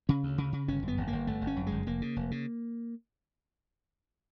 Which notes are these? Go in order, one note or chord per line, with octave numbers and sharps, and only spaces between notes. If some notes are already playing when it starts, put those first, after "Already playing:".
C#3 C#4
D2
C#3
C#3
G1 C#4
F#2
B3
G1
A#3
G1
G1 A3
G1
C#4
F#2
G#3
G1
F1 A#3
C#3
F1
C#3